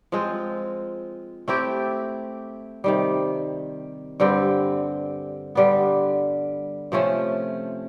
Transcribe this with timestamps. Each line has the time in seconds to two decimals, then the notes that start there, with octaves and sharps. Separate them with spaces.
0.12 F3 G#3 C4 F4
1.48 A3 C4 E4 G4
2.84 C3 D#3 G3
4.20 G2 D3 G3 C4
5.55 D3 G3 B3
6.92 C3 F3 A3 C#4